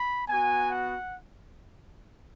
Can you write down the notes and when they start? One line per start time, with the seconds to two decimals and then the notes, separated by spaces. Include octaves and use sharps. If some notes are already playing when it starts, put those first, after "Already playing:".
Already playing: B5
0.28 B3 F#4 G#5
0.71 F#5